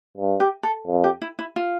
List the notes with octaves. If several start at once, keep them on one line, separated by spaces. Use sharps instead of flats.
G2
G4
A4
F2
G4
E4
E4
F4